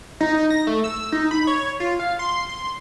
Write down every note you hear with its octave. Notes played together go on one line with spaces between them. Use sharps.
D#4
A#6
A3
E6
D#4
B5
C#5
F4
F5
C6
C6